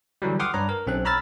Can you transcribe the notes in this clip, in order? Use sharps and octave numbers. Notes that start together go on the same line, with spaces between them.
D3 E3 F#3 G3
F#5 G5 C6 D6 D#6 F6
G2 D4 B4 C#5 A#5
A#4
B1 C4 C#4 A4 F#6
C#5 A#5 B5 E6 F6 A6